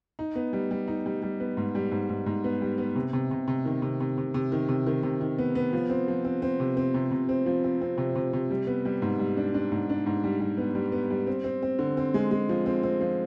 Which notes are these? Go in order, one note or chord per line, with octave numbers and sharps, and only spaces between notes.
D#4
B3
G3
G3
D#4
G3
G3
B3
G#2
G3
G#2
G#2
G#2
B3
G3
B3
C3
C3
C3
C3
D#3
C3
C3
C3
C3
D#3
C3
D#3
C3
D#3
B3
B3
F3
C4
F3
C4
C4
C3
C4
C3
C3
C4
F3
C4
C4
C3
C3
C3
G3
B3
G3
G#2
G3
D4
D4
G#2
D4
G#2
G3
G3
B3
G3
B3
G3
C4
C4
C4
D3
C4
G#3
G#3
F3
C4
C4
F3